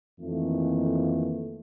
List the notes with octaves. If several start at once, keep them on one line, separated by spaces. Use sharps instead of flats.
F2 D#3 E3 A3 A#3